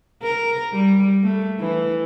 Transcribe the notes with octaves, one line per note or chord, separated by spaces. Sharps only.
A#4
G3
A3
E3